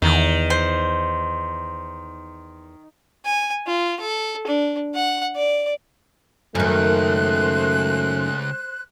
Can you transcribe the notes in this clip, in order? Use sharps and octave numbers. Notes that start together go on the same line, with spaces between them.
E2 D#3
C5
G#5
F4
A4
D4
F#5
D5
C#2 F#2 D#3 A3 C5 F#6